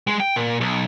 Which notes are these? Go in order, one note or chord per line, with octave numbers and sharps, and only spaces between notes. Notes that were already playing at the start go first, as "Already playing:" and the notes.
G#3
G5
A#2
B1